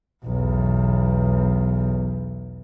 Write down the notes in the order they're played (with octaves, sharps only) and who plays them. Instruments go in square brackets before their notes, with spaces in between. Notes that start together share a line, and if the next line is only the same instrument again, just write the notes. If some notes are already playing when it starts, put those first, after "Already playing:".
[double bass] B1 E2